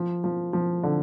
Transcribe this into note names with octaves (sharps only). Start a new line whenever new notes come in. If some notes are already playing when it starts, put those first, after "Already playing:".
Already playing: F3
F3
F3
D3